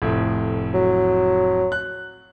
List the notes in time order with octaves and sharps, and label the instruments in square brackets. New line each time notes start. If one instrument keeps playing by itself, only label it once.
[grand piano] F1 F2 A2
[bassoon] F#3
[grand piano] F#6